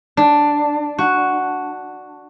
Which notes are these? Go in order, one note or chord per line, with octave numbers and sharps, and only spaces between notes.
D4
F#4